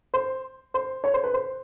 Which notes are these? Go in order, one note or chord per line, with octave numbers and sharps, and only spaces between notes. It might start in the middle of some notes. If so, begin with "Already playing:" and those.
C5
C5
C#5
C5
B4
C5